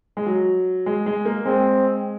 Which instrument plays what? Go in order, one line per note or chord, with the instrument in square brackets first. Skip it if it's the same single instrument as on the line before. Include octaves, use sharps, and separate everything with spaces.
[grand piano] G#3
F#3
G#3
G#3
A#3
[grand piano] G#3 [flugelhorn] C4